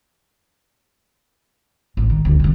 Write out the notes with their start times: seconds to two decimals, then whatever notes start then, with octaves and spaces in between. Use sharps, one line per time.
1.97 A1 G2
2.10 D#3
2.25 D2
2.40 C2 D#3